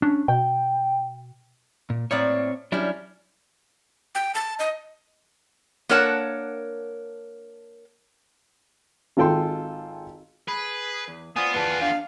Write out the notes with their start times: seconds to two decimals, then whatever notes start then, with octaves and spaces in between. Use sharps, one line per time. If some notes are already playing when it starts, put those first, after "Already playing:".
0.02 C#4 D4
0.28 B2 G5
1.90 A#2
2.11 A2 A#3 C4 C#5 D5
2.72 F#3 G3 C#4 D4 E4
4.15 G5
4.34 A5
4.59 D#5
5.89 A#3 D4 A#4 C#5 F#5 A5
9.17 G#1 F4 A4 G5 C6
10.48 G#4 B4
11.08 E2
11.36 B3 F4 C5 D5 G#5 D#6
11.54 B3 G#4 B4 D5 A5
11.82 D4 F5